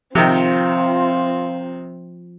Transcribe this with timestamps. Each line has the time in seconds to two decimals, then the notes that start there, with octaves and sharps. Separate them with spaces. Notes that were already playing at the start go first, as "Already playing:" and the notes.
0.15 C3 D#3 F3 C4 F4